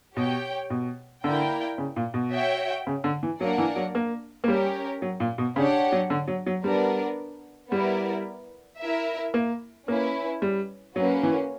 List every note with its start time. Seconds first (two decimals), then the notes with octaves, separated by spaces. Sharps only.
0.16 B2 G4 C#5 G5
0.70 B2
1.24 D3 A#3 E4 A#4 D5 G5
1.78 C#3
1.96 A#2
2.14 B2
2.32 F#4 C#5 E5 G5
2.87 C#3
3.04 D3
3.23 E3
3.40 F#3 A#3 D4 A#4 D5 F#5
3.58 E3
3.76 F#3
3.95 A#3
4.44 A#3
4.48 G3 C#4 G4 A#4 C#5
5.02 F#3
5.20 A#2
5.38 B2
5.56 C#3 D4 G4 C#5 F#5
5.92 F#3
6.10 D3
6.28 F#3
6.46 F#3
6.64 G3 B3 D4 A#4 D5
7.72 G3 B3 E4 A#4 D5
8.80 E4 A#4 E5
9.34 A#3
9.88 A#3 C#4 E4 B4
10.42 G3
10.96 F#3 A#3 C#4 F#4 B4
11.23 E3